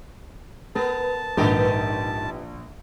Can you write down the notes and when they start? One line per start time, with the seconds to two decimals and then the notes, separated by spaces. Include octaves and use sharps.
0.75 B3 A#4 B4 A5
1.37 A#1 G#2 D#3 B3 G4 A#4